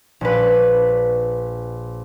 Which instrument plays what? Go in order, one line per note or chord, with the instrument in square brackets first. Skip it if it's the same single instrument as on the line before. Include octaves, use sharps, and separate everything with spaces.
[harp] A#1 B4